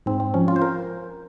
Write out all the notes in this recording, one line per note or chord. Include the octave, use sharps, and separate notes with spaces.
G#2 C4
C4
F3 C#4
F4
C5
A#4